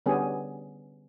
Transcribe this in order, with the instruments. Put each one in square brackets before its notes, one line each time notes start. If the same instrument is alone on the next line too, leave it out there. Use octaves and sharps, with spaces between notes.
[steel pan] D3 G3 B3 C#4 G4 G#4